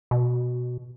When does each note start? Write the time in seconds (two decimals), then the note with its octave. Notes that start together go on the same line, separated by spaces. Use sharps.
0.11 B2